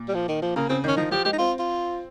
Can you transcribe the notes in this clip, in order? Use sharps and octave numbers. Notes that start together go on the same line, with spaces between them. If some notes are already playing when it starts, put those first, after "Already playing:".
Already playing: A#2
G3
F3
D#3
F3
C#3 A#3
C#3 C4
D#3 C#4
F3 D#4
F3 G4
G#3 G4
D#4
C4 F4
F4